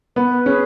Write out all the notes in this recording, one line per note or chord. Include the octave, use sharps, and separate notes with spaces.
B3 B4
C#4 G#4